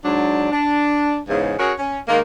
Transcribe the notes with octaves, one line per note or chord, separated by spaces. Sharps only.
G#2 F#3 D4
D4
E2 G#2 C#3
C#4 F#4 G#4 A#4 C#5
C#4
D#3 G#3 A#3